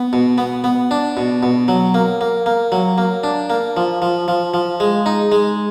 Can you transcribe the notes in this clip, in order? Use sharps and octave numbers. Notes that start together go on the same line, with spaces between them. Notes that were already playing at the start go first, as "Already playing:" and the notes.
Already playing: B3
B2
B3
B3
D4
B2
B2
F#3
A#3
A#3
A#3
F#3
A#3
D4
A#3
F3
F3
F3
F3
G#3
D#4
G#3